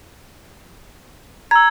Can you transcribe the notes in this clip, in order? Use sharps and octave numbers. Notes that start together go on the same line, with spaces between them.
A#5 E6 G#6